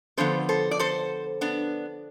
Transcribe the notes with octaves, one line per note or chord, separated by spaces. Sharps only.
D3 F3 B3 A4 C5
A4 C5
D5
A4 C5
B3 D4